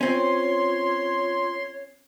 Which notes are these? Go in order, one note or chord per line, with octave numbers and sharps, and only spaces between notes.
C4 C#4 F4 C#5 C6